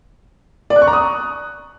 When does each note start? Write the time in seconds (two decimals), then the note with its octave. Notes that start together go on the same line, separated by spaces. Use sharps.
0.70 D5
0.76 F#6
0.82 C#6
0.87 A#5
0.93 D#6